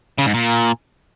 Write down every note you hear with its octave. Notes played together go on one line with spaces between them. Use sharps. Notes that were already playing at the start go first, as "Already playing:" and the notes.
C#3
G#2
A#2